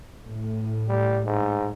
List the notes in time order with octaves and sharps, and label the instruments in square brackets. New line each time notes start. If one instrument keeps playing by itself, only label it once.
[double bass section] A2
[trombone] G3
G#2